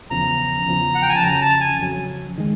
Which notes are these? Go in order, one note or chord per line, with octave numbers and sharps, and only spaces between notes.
E2 C#3 F3 A#5
E2 C#3 F3
F#5
G5
G#5
A5
F2 C#3 F#3 A#5
A5
G#5
F2 C#3 F#3
D#3 G#3